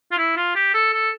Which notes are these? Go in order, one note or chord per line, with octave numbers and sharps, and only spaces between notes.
F4
E4
F4
G4
A4
A4